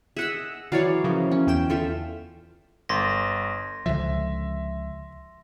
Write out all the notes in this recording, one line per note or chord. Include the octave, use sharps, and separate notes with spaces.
G#4 D#5 E5 F#5 E6
E3 F#3 C#5 D5 F5
C#3 F3 A#3
C#4
E2 G5 E7
F4 A4 E5
G1 C6 A#6
C#2 D3 F3 E5